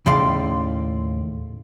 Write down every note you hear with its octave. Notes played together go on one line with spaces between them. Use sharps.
D#2 A2 C#3 D5 F5 C6